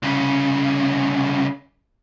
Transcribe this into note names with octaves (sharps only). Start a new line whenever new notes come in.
C2 C#3